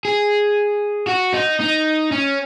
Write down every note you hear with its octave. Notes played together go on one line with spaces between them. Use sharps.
G#4
F#4
D#4
D#4
C#4